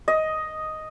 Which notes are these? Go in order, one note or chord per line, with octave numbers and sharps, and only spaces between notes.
D#5